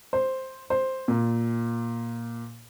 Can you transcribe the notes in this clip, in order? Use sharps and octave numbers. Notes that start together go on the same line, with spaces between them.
C5
C5
A#2